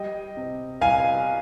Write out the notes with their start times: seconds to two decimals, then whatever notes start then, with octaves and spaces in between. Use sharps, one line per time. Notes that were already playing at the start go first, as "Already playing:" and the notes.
Already playing: G3 D#5 G5
0.37 C3
0.81 C2 F5 G#5